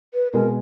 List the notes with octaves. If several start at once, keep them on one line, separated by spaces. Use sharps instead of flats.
B4
B2 G#3 B3 A#4